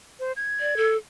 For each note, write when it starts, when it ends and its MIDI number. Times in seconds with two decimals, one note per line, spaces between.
0.20 0.32 72
0.36 0.88 92
0.60 0.75 74
0.77 0.97 69